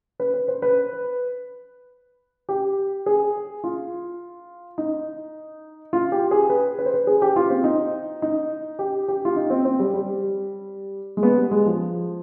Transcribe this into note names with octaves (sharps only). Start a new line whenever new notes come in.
B4
B4
C5
B4
G4
G#4
F4
D#4
F4
G4
G#4
B4
B4
C5
B4
G#4
G4
F4
C4
D#4
D#4
G4
G4
F4
D#4
C4
C4
G3
G3
G#3
B3
G3
G#3
F3